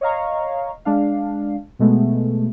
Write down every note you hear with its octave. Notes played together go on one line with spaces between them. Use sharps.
C#5 D#5 F5 A#5 C#6
G#3 D4 F5
B2 G#3 A3 B3